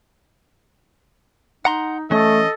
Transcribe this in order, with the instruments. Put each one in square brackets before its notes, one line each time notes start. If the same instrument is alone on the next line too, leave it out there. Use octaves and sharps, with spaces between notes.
[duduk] D#4 [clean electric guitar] F#5 A#5 C6
[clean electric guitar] E3 C#4 [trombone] A3 [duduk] A4 [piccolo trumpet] D#5